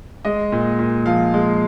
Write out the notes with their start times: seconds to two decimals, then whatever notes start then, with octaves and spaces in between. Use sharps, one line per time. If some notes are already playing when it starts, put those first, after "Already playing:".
0.25 G#3 D#5
0.52 A#2
0.79 A#2
1.06 F3 F5
1.34 G#3